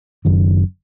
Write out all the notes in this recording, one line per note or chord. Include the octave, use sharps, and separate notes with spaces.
F#1 F#2 D#3